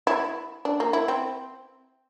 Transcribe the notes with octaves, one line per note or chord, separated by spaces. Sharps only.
E4
D4
A#3
E4
C4